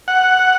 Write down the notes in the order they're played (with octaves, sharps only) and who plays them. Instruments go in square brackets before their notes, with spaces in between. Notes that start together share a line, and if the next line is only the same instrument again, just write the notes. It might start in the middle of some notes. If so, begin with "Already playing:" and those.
[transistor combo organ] F#5